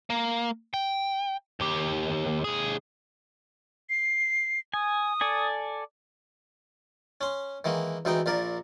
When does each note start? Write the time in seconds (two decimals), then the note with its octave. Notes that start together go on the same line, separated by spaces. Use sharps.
0.10 A#3
0.74 G5
1.60 D#2 G4
2.44 D#2 G#4
3.89 C7
4.74 G#5 D#6
5.21 A4 D5 G#5
7.21 C#4 C6
7.64 D#3 E3 G#3 A#3
8.05 D2 E3 G#3 D#4 G5
8.26 A#1 A#2 A#4 D5